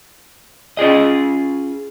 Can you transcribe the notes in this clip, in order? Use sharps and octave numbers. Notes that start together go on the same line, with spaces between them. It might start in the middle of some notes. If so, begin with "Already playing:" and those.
C#4 F4 G#4 D#5